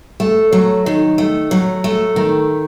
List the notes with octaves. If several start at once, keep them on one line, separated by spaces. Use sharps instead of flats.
A3
F#3
D#3
A3
F#3
A3
D#3